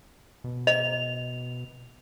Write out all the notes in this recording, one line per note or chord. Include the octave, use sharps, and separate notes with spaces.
B2
D#5 F7